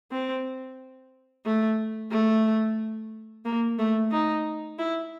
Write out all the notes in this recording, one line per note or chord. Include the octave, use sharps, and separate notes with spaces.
C4
A3
A3
A#3
A3
D#4
E4